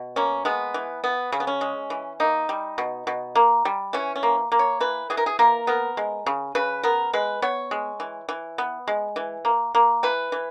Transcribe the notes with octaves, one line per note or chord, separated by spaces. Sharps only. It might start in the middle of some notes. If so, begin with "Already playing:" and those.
Already playing: B2
A#3 C#4
G#3 B3
E3
B3
C#3 C#4
B3
C#4
G#3
E3
A#3 D#4
G3
B2
B2
A#3
G3
E3 C#4
C#4
A#3
A#3
C#5
E3 B4
E3 G#4
A#4
G#4
A#3 A#4
B3 A#4
G#3
C#3
C#3 B4
B3 A#4
G#3 B4
B3 C#5
G#3
E3
E3
B3
G#3
E3
A#3
A#3
E3 B4
E3